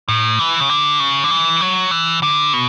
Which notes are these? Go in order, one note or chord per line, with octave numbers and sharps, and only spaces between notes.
A2
E3
C#3
D3
C#3
D3
E3
F#3
E3
D3
B2